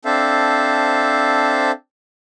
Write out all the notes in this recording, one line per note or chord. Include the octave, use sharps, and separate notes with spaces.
C4 D4 A4 C5 E5 F5